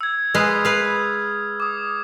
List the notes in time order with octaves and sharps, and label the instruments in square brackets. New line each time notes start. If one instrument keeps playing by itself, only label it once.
[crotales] E6 G#6
[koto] G#3 B4 F5 [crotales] D#6 F6
[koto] B4 F5
[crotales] D6 D#6